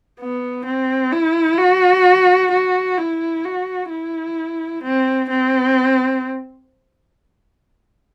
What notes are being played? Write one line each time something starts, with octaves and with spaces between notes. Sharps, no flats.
B3
C4
E4
F#4
F#4
E4
F#4
E4
C4
C4